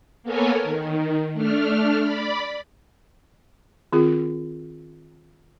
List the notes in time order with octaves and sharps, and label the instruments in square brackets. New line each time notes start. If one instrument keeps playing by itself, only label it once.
[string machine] A#3 B3 A4 A#4 C#5 G#5
D#3
A3 D4 F6
D5 B5
[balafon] D#3 C4 F4 G#4